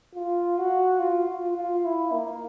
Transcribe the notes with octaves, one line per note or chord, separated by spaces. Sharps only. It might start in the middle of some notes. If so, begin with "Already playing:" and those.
F4
F#4
F4
F4
F4
E4
A#3